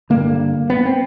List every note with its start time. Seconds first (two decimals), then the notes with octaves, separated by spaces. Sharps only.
0.10 G2 D3 A#3
0.70 B3
0.85 C4